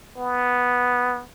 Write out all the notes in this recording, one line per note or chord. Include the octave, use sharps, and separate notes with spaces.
B3